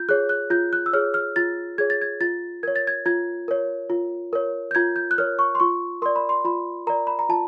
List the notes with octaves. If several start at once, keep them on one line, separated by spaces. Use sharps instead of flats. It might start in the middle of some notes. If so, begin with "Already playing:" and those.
Already playing: F4 G6
G#4 C#5 F#6
F#6
F4 G6
F#6
E6
G#4 C#5 F6
F6
F4 A6
G#4 C#5 G#6
A6
G#6
F4 A6
A#4 C#5 G#6
A6
G#6
F4 G#6
A#4 C#5
F4
A#4 C#5
G6
F4 G#6
G6
F#6
A#4 C#5 F6
C#6
C6
F4 C#6
A#4 D5 C6
B5
C6
F4 B5
A#4 D5 A#5
B5
A#5
F4 A5